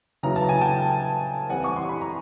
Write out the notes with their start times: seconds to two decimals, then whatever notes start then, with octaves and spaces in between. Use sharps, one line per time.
0.23 C#3 F#3 B3 E4 A#5
0.36 A5
0.49 G#5
0.61 G5 A5
1.50 E3 G3 C4 E4 F#5 G#5
1.64 C#6
1.76 C6
1.89 B5
2.01 A#5